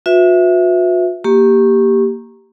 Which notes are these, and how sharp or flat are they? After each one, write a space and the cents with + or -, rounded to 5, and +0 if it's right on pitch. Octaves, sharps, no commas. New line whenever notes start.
F#4 -45 B4 +0 E5 +0
A#3 +0 G4 +0 C#6 -20